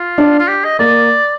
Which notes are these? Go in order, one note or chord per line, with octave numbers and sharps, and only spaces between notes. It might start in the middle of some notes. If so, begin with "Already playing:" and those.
Already playing: F4
D4
F4
G4
D#5
A#3 D5